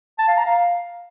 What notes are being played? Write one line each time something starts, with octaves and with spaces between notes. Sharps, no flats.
A5
F5
A#5
F5